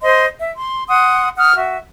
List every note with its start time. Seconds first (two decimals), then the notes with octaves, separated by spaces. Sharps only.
0.03 C5 D#5 C6
0.40 E5
0.56 C6
0.88 F#5 C6 D#6
1.37 F#5 D#6 F6
1.56 F#4 E5